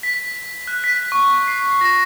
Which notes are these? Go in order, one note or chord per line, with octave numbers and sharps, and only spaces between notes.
B6
F#6
B6
C#6
C7
A#6